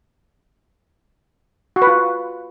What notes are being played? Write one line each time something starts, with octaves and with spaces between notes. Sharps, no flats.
F#4
B4
F4